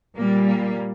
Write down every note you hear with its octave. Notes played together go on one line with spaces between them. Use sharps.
A#2 G3 A#3
A#3